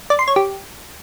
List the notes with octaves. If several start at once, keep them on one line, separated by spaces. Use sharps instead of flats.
D5
C6
C#5
G4